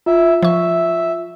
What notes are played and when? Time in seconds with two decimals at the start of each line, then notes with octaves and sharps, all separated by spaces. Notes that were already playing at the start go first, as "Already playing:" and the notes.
0.06 F4 E5
0.43 F3 E5 C#6